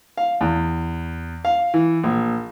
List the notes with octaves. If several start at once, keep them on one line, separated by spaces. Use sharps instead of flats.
F5
E2
F5
E3
A#1